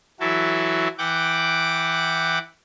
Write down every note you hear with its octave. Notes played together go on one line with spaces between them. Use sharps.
E3 F#3 E4 F#4 A4
E3 F#5 G5 D6